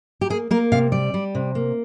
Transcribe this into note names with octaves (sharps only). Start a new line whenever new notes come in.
G4
A#3 G#4
A#3 A#4
C3 F5
G3 D5
G3
C3
A#3